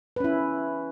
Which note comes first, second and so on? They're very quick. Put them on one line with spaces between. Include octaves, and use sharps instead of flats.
B4 C#4 E4